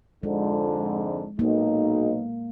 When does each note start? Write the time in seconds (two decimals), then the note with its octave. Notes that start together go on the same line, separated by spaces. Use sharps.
0.23 F2 G#2 D3 G#3
1.39 B1 A#3 D#4